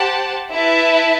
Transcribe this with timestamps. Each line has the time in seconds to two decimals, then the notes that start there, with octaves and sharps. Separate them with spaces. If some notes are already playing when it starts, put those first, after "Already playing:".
Already playing: G4 C5 F#5 A5
0.51 E4 B4 E5 A5